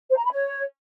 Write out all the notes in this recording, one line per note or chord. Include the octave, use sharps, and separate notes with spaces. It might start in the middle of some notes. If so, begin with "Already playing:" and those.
C5
A#5
B5
C#5